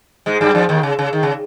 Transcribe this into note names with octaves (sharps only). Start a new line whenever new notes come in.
G#2 G#3
G2 G3
F2 F3
D#2 D#3
C#3
C#3
D#3
C#3